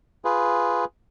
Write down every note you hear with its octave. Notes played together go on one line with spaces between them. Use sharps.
F4 G#4 B4